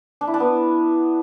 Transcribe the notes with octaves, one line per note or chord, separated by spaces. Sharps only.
D4
E4
D4
B3